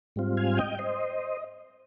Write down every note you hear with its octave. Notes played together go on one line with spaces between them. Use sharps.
G#2 G3 C4 F4
F5 G#5
D#5 G5
C5 D#5